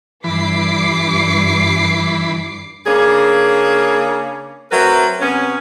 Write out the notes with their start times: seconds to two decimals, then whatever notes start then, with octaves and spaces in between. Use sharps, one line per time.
0.24 G2 E3 B5 D6 C7
2.87 C#3 A#3 C#4 D4 G#4
4.71 F#3 A3 C4 A#4 B4
5.20 C3 B3 C#4